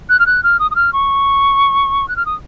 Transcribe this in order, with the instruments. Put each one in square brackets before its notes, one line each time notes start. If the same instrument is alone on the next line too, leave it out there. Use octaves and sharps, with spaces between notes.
[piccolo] F#6
F6
F#6
F6
D#6
D#6
F6
C#6
F#6
F6
D#6